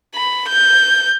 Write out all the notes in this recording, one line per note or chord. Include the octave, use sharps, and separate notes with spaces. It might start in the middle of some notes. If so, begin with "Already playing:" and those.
B5
G6